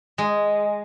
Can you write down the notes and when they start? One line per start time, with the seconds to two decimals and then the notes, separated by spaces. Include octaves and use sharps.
0.18 G#3